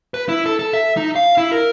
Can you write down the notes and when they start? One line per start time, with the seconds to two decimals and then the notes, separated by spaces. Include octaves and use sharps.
0.14 B4
0.29 E4
0.46 A4
0.59 A4
0.73 E5
0.97 D#4
1.16 F5
1.37 E4
1.52 A#4